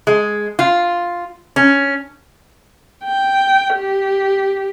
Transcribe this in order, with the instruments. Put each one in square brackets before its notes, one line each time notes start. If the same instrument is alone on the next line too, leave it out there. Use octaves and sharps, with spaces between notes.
[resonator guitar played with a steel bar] G#3
F4
C#4
[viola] G5
G4